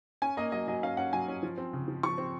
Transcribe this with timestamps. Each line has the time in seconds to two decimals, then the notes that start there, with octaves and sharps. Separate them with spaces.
0.22 C#4 G#5
0.37 A#3 D#5
0.52 F#3 D#5
0.68 F#3 D#5
0.83 C#4 F5
0.97 C#4 F#5
1.13 F#3 G#5
1.28 C#4
1.43 F3
1.58 C4
1.73 C#3
1.88 F3
2.03 F3 C#6
2.18 C4